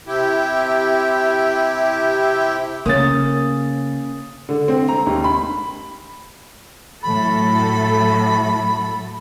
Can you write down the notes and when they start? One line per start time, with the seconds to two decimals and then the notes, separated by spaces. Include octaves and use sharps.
0.07 C3 E4 G4
2.86 C#3 A#3 C#4 D#6 A6
4.49 D3
4.68 C4
4.88 A#5
5.06 D#2
5.24 B5
7.03 A2 F#3 A4 B5